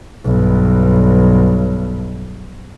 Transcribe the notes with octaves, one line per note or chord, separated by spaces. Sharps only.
B1 G2